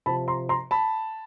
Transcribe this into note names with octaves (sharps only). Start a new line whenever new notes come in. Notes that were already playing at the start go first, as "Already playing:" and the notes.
C3 F3 A5 B5
A#5 C6
A#5 C6
A5 B5